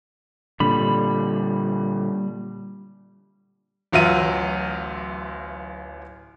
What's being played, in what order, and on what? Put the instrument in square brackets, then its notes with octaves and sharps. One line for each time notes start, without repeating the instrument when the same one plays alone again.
[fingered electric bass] A#2 D3 [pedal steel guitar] G3 B5
[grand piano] D1 A1 F#3 F4 E5 D#7